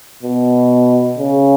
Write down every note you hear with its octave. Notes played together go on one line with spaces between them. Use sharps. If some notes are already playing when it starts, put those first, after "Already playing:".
B2
C#3